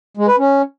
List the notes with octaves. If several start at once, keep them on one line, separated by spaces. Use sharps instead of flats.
G#3
B4
C#4